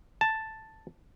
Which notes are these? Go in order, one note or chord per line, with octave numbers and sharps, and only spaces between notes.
A5